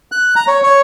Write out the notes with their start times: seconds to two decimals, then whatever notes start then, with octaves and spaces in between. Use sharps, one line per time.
0.12 F#6
0.36 A#5
0.48 C#5
0.63 C#5